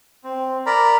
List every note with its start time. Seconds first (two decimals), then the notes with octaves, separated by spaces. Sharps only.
0.24 C4
0.66 A#4 D5 A#5 B5